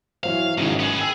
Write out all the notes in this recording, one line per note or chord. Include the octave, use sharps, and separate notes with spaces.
E3 F#3 C5 F5
G#1 E2 C#3 F#3 G#3
B3 G#4
G#4 G5 E6